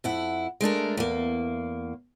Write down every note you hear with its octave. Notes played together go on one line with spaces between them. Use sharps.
F2 E4 F#5
G#3 A3 D4 A#4
E2 A#3